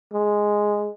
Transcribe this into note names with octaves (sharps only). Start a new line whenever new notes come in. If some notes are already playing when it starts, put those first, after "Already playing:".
G#3